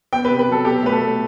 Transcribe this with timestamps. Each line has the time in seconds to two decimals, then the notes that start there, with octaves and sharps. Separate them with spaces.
0.13 B3 G5
0.25 B4
0.30 C3
0.39 B4
0.47 F#3 A4
0.65 B2 G4
0.83 A3 B4
0.92 A4
1.01 A3